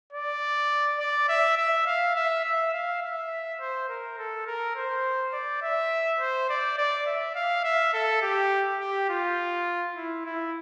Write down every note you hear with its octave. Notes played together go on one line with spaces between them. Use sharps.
D5
D5
E5
E5
F5
E5
E5
F5
E5
C5
A#4
A4
A#4
C5
D5
E5
C5
D5
D5
E5
F5
E5
A4
G4
G4
F4
E4
E4